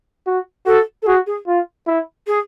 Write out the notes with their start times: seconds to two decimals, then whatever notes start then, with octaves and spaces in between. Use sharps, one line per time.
0.27 F#4
0.66 F#4 A4
1.02 A4
1.06 F#4 G#4
1.26 G#4
1.47 F4
1.87 E4
2.27 G#4